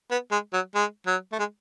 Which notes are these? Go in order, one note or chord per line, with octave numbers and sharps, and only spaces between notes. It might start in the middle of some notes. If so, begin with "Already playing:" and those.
B3
G#3
F#3
G#3
F#3
A3
G#3